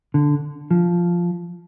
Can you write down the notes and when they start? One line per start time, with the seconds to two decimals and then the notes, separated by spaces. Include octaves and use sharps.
0.14 D3
0.71 F3